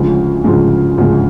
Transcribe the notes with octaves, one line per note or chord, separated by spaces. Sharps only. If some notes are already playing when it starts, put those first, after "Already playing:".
Already playing: D2 C#3 F3 G#3
D2 C#3 F3 G#3
D2 C#3 F3 G#3